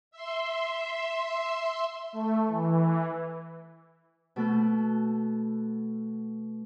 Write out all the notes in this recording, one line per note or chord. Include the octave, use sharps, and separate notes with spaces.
E5 C6
A3
E3
B2 A3 A4 F#6